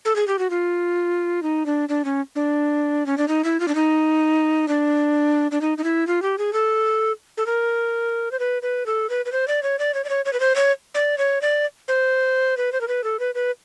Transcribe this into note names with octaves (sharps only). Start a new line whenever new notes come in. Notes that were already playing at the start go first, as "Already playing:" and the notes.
A4
G#4
G4
F#4
F4
D#4
D4
D4
C#4
D4
C#4
D4
D#4
E4
F4
D4
D#4
D4
D4
D#4
D#4
E4
F4
G4
G#4
A4
A4
A#4
C5
B4
B4
A4
B4
B4
C5
D5
C#5
D5
C#5
D5
C#5
C#5
B4
C5
C#5
D5
C#5
D5
C5
B4
C5
A#4
B4
A4
B4
B4